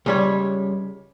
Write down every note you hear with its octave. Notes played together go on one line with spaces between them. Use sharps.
C#2 G3 C#5